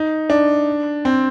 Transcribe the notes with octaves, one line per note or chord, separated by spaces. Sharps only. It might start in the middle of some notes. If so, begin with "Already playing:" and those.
Already playing: D#4
D4
C4